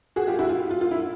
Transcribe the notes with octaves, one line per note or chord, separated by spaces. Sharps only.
F#4 G#4
F4 G4
E4 F#4
F4
F4
F4
E4